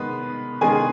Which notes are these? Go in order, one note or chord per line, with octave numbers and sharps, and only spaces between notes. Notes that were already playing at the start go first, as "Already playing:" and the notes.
Already playing: D#3 G#3 B3 B4
D#3 G#3 B3 G#4 G#5